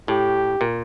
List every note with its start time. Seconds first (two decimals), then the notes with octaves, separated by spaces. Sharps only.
0.08 A2 G4
0.61 A#2